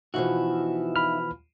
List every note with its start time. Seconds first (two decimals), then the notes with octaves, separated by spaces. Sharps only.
0.14 B2 E3 F3 D#4 F4 F#4 E5
0.96 B5 F6